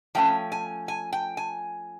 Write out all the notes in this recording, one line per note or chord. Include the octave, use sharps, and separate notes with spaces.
F3 A3 C#4 G5
G#5
G#5
G5
G#5